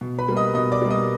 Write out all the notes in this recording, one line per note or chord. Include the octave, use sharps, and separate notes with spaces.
B2
B4 B5
G3 A#3
D#5 D#6
B2 D#5 D#6
D5 D6
G3 A#3
D#5 D#6